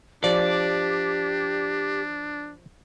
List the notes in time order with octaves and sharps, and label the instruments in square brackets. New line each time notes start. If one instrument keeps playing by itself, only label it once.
[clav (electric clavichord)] F3 [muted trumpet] D4 [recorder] G4 [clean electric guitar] D5